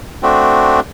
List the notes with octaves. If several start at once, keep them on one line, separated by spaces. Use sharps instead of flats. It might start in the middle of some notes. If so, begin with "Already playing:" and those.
A3 C4 D4 F#4